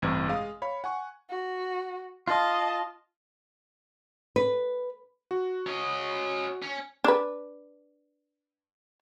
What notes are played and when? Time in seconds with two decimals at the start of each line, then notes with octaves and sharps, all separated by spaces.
0.02 A1 G2 C3 D4 G#6
0.28 G#3 F5 D#6
0.62 C#5 F5 B5
0.84 F#5 G#5 C#6
1.30 F#4
2.28 F4 D#5 A5
4.36 B4
5.31 F#4
5.67 C#4 D#5
6.62 C#4
7.04 D4 B4